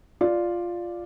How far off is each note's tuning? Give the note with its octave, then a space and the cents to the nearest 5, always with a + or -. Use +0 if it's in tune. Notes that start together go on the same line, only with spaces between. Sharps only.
F4 +0 D5 +0